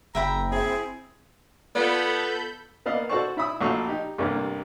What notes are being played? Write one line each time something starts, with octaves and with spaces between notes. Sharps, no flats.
F#1 E5 G5 A#5 B5
C4 E4 G#4
B3 F4 A4 D5 B5 G6
A#3 B3 D5 D#5 F5
F#4 A4 C5 D5 A5 C#6
E4 E5 B5 D#6
A#1 A3 F#4 F5 C#6 E6
D#4 G4
A1 G2 C3 A#3